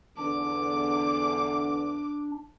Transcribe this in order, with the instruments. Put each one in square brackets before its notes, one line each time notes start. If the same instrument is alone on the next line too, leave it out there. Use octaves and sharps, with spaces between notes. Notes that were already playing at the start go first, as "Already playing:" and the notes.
[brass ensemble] E2 D3 [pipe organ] D4 [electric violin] D6